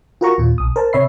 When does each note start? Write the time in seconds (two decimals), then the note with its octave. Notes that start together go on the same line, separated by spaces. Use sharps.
0.21 F4 F#4 A#4 F#5 A#5 C#6
0.38 D#2 A#2 F4
0.58 B1 D#6
0.76 A#4 C5 A5
0.93 C3 C#5 E5 B5 C7